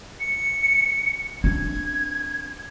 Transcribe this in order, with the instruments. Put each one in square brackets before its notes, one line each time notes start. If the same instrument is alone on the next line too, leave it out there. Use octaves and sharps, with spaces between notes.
[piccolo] C#7
[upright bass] C4 D4 [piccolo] G#6